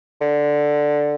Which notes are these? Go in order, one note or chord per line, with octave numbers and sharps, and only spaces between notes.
D3